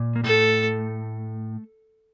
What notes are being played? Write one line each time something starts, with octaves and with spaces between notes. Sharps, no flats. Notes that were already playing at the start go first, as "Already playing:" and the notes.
Already playing: A#2
A#3
A2 A3 A4